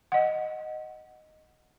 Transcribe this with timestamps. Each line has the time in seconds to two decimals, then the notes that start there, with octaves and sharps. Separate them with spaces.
0.12 D#5 F#5